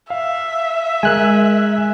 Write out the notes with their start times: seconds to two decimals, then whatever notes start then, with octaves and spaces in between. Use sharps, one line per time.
0.10 E5 F5
1.03 G#3 A#4 G#5 F#6